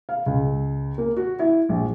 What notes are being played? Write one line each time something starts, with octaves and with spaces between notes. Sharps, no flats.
F5
C#2
A#3
F#4
E4
A#1